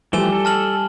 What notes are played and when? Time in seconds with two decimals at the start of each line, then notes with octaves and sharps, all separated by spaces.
0.13 E3 F3 G3 A3 G4 G#5 E7 G7
0.32 A4
0.45 A5 F6 F#7